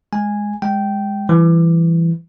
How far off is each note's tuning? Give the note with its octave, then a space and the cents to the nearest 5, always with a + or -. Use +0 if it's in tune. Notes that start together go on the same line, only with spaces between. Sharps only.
G#3 +0 G#5 -10
G#3 -15 G5 -10
E3 +15 G3 -10